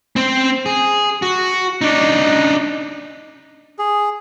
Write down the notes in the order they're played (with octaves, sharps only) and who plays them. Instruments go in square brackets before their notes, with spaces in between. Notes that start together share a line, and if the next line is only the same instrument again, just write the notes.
[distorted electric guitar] C4 C5
G#4
F#4
D4 D#4
[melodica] G#4